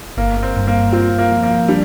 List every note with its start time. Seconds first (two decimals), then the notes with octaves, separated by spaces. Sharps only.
0.17 G1 A#3
0.37 A#3
0.43 C4
0.56 G2
0.67 A#3
0.93 C4 F4
1.18 A#3
1.31 F3
1.43 A#3
1.68 G3 D4